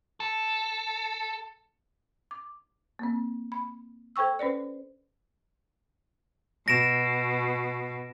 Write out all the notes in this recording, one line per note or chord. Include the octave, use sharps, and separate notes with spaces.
A4
D6
A#3 C4
B5
A4 C5 G5 C#6 E6
C#4 B4 C5 D5
B2 A#6 D7 E7